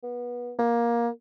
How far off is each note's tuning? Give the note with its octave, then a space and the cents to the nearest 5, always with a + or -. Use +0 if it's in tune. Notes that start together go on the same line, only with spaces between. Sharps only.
B3 -25
A#3 +15